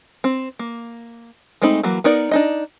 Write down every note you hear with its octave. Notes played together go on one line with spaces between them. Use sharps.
C4
A#3
G#3 A3 C4 D#4 B5
E3 F#3 A#3
B3 D#4 A#4 D5
D4 D#4 D#5